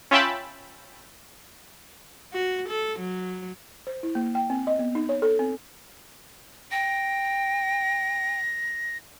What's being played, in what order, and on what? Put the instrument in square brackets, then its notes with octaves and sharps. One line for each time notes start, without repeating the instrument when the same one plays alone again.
[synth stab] C#4 F4 E5 G5 A5 B5
[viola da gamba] F#4
A4
F#3
[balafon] C5
E4
A#3
G5
C4
D#5
B3
D#4
C#5
A4
C4
[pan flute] G5 [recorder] A#6